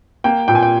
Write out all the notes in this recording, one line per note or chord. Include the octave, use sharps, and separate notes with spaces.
A#3 G5
A#2 G5
G#5
G5